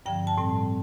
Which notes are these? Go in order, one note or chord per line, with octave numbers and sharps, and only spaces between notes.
G2 D3 F3 C4 G5
A5
A2 G3 C4